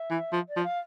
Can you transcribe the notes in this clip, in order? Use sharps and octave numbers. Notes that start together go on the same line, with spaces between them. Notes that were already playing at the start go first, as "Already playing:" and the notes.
Already playing: E5
E3
F3
D5
F3
F5